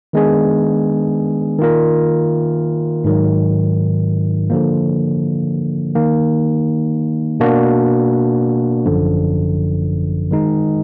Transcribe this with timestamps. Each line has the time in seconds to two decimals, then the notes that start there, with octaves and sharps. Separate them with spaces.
0.13 D#3 G#3 B3 D4 G#4
1.59 D#3 A#3 F4 A#4
3.04 G#2 D#3 F#3
4.50 D3 F3 A#3
5.95 D#3 A#3 D#4
7.40 B2 A#3 D4 F#4
8.86 G#1 F#2 D3 F3
10.31 D#3 G#3 D#4